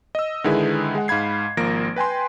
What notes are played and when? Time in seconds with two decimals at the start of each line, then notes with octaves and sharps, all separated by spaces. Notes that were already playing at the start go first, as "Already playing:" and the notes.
0.15 D#5 E6
0.44 D3 D#3 G#3 E4 G#4 B4
0.95 G#3 F#5
1.08 G#2 F5 B5 G#6 C7
1.57 G#1 F3 A#3 A#6 D7
1.96 B4 G5 G#5 C6